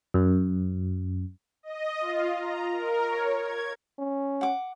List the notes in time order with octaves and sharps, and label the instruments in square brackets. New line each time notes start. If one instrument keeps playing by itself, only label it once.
[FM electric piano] F#2
[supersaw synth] D#5
F4
A#5
A#4
C#5
G#6
[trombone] C#4
[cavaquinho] F#5 D6